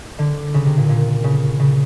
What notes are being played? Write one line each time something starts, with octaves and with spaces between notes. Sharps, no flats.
D3
C#3
C3
A#2
A#2
C#3
C#3